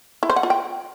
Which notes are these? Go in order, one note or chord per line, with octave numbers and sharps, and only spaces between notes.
E4
C5
F#5
F4
G5